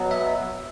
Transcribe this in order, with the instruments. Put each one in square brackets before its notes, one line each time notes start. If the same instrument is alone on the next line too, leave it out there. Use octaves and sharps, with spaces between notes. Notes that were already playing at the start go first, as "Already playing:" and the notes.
Already playing: [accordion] B2 F#3 B3
[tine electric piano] E5